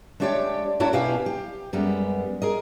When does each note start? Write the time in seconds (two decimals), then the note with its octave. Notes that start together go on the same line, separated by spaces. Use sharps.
0.20 G#3 A3 D4 G4 C#5 D5
0.80 A3 D4 E4 F#4 A#4 C#5
0.93 B2 E4 G4 B4 F5 G#5
1.26 G4
1.73 F#2 G3 G#3 B3
2.42 G#4 A#4 D#5